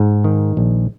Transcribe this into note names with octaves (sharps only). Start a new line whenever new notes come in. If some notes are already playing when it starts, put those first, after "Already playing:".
Already playing: G#2
D#3
A#1